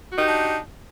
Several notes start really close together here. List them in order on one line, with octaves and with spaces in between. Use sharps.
F#4 D#4 G4 D4